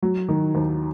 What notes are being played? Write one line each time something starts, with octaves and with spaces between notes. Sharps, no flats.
F#3
D#3
D#2